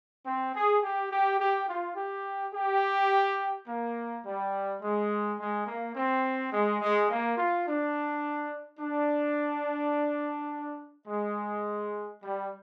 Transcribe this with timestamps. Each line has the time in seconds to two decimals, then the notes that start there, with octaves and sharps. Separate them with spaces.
0.25 C4
0.53 G#4
0.82 G4
1.10 G4
1.38 G4
1.67 F4
1.95 G4
2.53 G4
3.67 A#3
4.24 G3
4.80 G#3
5.37 G#3
5.66 A#3
5.94 C4
6.51 G#3
6.80 G#3
7.08 A#3
7.37 F4
7.66 D4
8.79 D4
11.07 G#3
12.22 G3